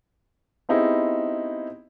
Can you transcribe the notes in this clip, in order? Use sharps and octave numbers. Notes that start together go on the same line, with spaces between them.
B3 C4 D#4 E4 G4 G#4